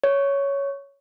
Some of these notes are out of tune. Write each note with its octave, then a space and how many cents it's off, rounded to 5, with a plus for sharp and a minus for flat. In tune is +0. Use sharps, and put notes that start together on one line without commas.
C#5 +5